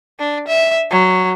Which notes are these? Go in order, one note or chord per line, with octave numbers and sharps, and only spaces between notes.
D4
E5
F#3